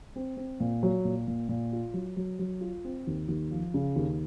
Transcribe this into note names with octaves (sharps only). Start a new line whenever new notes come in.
C4
C4
A#2
F#3
A#2
A#2
A#2
F4
F#3
F#3
F#3
F4
C4
D#2
D#2
F3
C#3
D#2